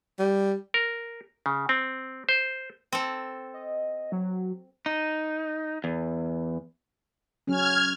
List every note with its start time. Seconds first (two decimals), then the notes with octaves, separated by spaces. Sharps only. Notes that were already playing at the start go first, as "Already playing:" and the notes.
0.19 G3
0.74 A#4
1.46 C#3
1.69 C4
2.29 C5
2.92 C4 A4
3.54 D#5
4.12 F#3
4.86 D#4
5.84 E2
7.47 F#3 C#4 F6 G#6